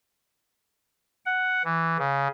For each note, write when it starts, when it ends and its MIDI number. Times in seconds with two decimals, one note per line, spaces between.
1.26 1.62 78
1.65 1.97 52
1.99 2.28 49